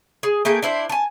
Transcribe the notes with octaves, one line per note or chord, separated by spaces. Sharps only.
G#4
A3 A#3 G#4 G5
D4 E4 C5
G#5 A5